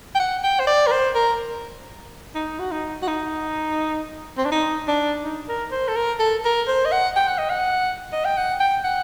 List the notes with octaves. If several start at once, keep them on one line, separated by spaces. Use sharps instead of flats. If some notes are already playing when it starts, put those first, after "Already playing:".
G5
F#5
G5
C5
D5
A#4
C5
A#4
D#4
F#4
D#4
F#4
D#4
C4
D4
D#4
D4
D#4
A#4
C5
A4
A#4
A4
A#4
C5
D#5
F#5
G5
F#5
D#5
F#5
D#5
G5
F#5
G5
F#5